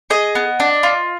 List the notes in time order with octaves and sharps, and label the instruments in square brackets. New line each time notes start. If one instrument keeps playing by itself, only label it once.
[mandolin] G#4 D#5
B3
D4
F4